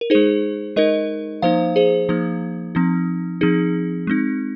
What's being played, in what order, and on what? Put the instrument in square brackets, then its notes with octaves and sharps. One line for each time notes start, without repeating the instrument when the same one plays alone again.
[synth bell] A#4
G#3 D#4 G#4 C5
G#3 D#4 A#4 D#5
F3 A#3 D#4 C5 F5
G#4 C5
F3 A#3 D#4
F3 C4 D#4
F3 C4 D#4 G#4
G#3 C4 D#4